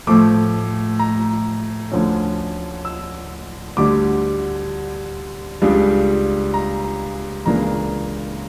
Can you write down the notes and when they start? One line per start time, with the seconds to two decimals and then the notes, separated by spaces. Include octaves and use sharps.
0.07 A2 F3 A3 D6
0.99 A#5
1.91 D2 D3 F3 C#4
2.85 E6
3.77 D2 D3 G3 D6
5.62 C#2 C#3 G3 D4
6.54 A#5
7.46 C#2 C#3 E3 A#3 D4 A#5